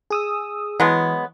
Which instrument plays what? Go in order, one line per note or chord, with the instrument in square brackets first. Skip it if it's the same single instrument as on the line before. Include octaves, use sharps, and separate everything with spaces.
[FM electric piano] G#4 D#6 E6
[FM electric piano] E3 [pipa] F#3 G#3 B3